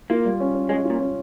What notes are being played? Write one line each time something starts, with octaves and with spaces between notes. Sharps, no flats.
A#3 F4
G3
C#4
C#4
G#3 C#4
F4
A#2
C#4